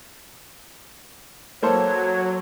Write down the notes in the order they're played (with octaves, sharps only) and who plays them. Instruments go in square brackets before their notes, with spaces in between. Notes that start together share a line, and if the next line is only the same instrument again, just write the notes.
[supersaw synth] F#3 [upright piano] A#3 A4 C5 [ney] C#5